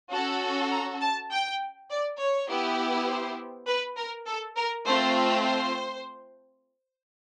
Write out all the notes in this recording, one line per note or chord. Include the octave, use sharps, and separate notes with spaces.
C#4 F#4 A4 A5
A#5
A5
G5
D5
C#5
B3 E4 G4
C5
B4
A#4
A4
A#4
A3 C4 F4 C5
C5